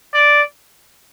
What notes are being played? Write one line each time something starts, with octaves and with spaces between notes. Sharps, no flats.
D5